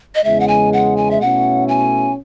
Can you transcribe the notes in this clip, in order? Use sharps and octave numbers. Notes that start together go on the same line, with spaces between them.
D#5
E2 C#3 G#3 E5
F#5
G#5
F#5
G#5
E5
B2 A3 C#4 E4 F#5
G#5